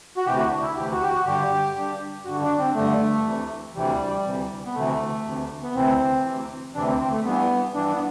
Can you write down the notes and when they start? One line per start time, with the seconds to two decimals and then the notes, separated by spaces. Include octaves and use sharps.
0.17 F#4
0.26 D2 C3 E3 G4
0.38 F#4
0.50 D4
0.62 E4
0.76 D2 C3 E3 G4
0.92 F#4
1.02 G4
1.09 F#4
1.25 G2 D3 G4
1.75 G2 D3
2.25 G2 D3 F#4
2.41 D4
2.58 C4
2.75 G2 D3 A3
3.25 D2 C3 E3
3.74 D2 C3 E3 G3
4.25 D2 C3 E3
4.65 B3
4.75 D2 C3 E3 A3
5.25 D2 C3 E3
5.63 B3
5.75 D2 C3 E3 C4
6.24 D2 C3 E3
6.75 D2 C3 E3 D4
6.88 C4
7.00 C4
7.12 A3
7.25 G2 E3 B3
7.74 G2 E3 D4
7.94 B3